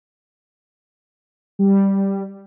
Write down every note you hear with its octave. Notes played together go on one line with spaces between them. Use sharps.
G3